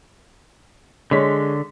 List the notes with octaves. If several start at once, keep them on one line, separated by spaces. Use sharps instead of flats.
D3 G#3 C#5 B6